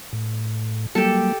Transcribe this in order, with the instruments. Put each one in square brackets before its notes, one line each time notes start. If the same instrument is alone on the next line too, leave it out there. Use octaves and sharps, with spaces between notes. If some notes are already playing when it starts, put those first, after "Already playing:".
[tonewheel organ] A2
[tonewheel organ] F#3 G3 A#3 [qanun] G4 A4